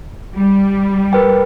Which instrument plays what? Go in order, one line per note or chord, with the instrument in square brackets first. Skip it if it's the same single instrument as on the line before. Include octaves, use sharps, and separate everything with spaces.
[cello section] G3
[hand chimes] A#4 B4 G5